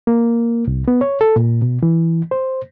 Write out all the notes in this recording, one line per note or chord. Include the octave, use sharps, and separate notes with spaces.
A#3
C2
B3
C#5
A4
A#2
B2
E3
C5